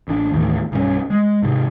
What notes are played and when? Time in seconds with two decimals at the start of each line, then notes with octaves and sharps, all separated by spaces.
0.08 A1 D4
0.32 D#2 A2 E3
0.72 B1 G2 D#3 C#4
1.10 G#3
1.43 G#2 C3